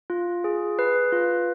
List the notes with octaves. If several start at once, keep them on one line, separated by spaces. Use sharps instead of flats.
F4
G#4
B4
F4